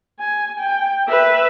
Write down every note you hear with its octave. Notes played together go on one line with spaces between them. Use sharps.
G#5
G5
B4 E5